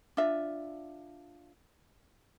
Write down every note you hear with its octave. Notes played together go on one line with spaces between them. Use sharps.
D4 F4 E5